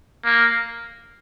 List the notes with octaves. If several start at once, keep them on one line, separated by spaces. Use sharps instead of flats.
A#3